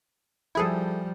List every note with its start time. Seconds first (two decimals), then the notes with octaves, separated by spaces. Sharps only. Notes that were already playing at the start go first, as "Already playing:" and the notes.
0.55 F3 G3 E4 G#4 A4